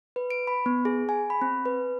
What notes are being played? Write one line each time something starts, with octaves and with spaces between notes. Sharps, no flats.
B4
D7
B5
B3
G#4
G#5
B5
C4
B4